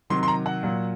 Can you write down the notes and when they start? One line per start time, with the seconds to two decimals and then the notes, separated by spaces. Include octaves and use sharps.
0.10 C3 D#3 F#3 C6
0.23 C6
0.28 A#5
0.46 F#5
0.63 A#2 F#3